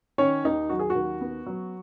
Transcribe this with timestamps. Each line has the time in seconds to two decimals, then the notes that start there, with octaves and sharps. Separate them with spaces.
0.18 D#3 C#4 C#5
0.44 D#2 D#4
0.69 F#3 F#4
0.79 G#4
0.90 F#4
0.95 D#2
1.21 B3
1.46 F#3